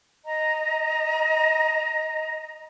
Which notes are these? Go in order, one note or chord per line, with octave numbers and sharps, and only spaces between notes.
D#5 A#5